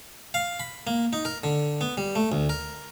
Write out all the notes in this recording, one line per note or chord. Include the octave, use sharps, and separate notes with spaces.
F5
B5
A#3
D#4
A#4
D3
B3
G3
A3
D2
A#4